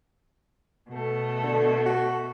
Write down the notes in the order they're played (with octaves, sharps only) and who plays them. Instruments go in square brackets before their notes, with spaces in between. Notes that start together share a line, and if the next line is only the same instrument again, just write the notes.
[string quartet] B2 A3
[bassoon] D3
F#4